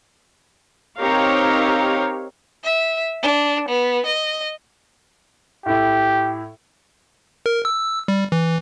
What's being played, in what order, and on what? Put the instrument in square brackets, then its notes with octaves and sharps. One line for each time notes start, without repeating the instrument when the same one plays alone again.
[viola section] C4 D#4 G4 A#4 C#5 F5
[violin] E5
D4
B3
D#5
[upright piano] A2 E4 [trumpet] G4
[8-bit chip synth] A#4
E6
G3
E3